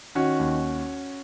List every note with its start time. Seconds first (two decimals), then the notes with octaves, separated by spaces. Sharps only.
0.15 D#3 C#4 F#4
0.39 D#2